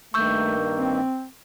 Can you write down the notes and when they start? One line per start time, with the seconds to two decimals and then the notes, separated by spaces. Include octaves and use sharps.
0.14 G2 D#3 A3 A#3 C#6 E6 G6
0.77 C4